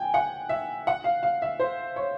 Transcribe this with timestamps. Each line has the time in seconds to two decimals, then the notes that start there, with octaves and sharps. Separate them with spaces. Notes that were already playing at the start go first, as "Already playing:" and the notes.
Already playing: G5 G#5
0.14 F#5
0.49 E5
0.87 F#5
1.04 F5
1.23 F5
1.42 E5
1.60 C5
1.96 C#5